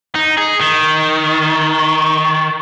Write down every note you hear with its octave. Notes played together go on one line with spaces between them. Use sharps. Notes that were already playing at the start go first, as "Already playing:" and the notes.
D#4
G#4
D#3